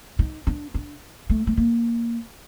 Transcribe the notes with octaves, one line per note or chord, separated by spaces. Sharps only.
D#4
D4
D4
A3
A3
A#3